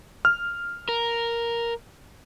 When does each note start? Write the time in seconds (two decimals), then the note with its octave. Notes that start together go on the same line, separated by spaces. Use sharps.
0.25 F6
0.89 A#4